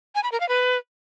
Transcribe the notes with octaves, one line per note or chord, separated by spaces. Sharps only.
G#5
B5
A#4
F5
B4